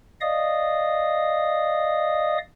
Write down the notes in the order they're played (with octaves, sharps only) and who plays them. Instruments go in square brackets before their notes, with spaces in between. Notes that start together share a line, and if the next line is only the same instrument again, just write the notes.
[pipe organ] D5 D#5 F5 D#6